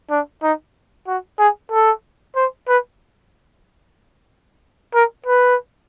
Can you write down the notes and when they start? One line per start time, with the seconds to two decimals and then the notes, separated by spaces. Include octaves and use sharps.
0.10 D4
0.43 D#4
1.07 F#4
1.39 G#4
1.72 A4
2.36 C5
2.68 B4
4.94 A#4
5.26 B4